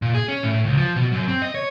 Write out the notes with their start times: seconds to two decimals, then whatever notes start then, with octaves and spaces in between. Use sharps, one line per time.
0.02 A#2
0.14 G#4
0.28 C#4
0.43 A2
0.64 C#2
0.78 F3
0.96 B2
1.12 F#2
1.28 C4
1.42 D#5
1.55 C#5